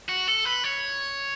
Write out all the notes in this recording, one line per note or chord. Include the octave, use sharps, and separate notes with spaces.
F#4
A4
B4
C#5